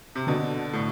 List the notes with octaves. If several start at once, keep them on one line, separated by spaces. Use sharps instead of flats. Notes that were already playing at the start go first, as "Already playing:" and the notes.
C3
B2 D3
A2